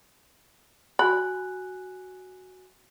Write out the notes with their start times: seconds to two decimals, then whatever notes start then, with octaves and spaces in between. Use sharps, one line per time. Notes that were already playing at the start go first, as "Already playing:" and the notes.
0.99 F#4 G#5 B5 F#6